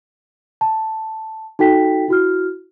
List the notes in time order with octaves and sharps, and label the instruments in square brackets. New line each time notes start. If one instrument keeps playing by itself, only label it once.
[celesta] A5
D#4 F#4 A4 G5 B6
E4 F#4 F6